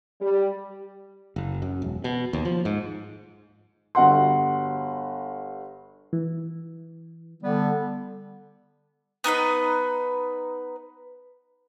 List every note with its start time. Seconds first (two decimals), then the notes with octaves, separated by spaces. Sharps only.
0.21 G3
1.36 F#1
1.62 F#2
1.82 E1
2.04 B2
2.33 D#2
2.45 F3
2.65 G#2
3.95 G1 F#4 F#5 C6
6.13 E3
7.42 D3 G3 B3
9.24 B3 D#4 A#4 B4